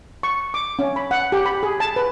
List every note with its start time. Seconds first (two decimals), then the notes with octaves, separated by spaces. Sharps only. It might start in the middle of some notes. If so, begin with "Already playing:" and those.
0.23 C#6
0.54 D6
0.79 C#4
0.96 B5
1.11 F#5
1.32 G4
1.46 B5
1.63 G#4
1.80 A5
1.96 B4